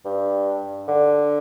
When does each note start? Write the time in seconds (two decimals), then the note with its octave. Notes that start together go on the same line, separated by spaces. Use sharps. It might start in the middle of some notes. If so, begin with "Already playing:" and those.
0.05 G2
0.88 D3